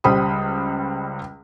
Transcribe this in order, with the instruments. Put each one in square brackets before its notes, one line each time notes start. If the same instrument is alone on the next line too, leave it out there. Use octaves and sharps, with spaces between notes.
[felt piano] C#2 G3 C5 B5 D#6